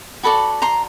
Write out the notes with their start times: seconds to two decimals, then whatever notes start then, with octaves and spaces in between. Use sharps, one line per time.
0.23 F#4 A4 D5 A5 B5
0.62 A#5 C6